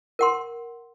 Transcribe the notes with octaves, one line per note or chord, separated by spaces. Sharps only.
A#4 F#5 C6